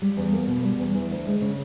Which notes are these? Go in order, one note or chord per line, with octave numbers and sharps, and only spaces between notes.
G3
E2
A#3
B2
G3
E2
E3
D2
G#3
C#3